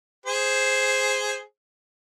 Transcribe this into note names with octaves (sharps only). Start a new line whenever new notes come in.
G#4 C5